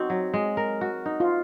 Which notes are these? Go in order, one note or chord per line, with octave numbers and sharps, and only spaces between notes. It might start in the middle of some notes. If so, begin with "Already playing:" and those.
Already playing: C4 D#4 F#4
F#3
G#3
A#4
F#4
D#4
F4